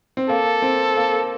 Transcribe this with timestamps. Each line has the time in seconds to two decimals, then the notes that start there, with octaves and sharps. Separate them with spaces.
0.17 C4
0.29 A#3 A4
0.62 C4
0.97 A#3